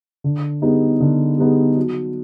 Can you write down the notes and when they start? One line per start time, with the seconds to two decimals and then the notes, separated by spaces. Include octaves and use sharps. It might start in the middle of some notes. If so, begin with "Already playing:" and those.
0.24 D3
0.62 G3 B3 D#4 G#4
1.00 D3
1.38 G3 B3 D#4 G#4
1.77 F#3